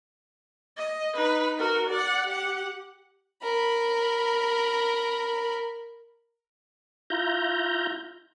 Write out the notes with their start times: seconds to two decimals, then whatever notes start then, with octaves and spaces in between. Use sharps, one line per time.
0.77 D#5
1.15 D#4 B4
1.58 F#4 A#4
1.90 D5 F#5
2.27 G4 F#5
3.43 A#4 B5
7.10 E4 F4 A#5 G6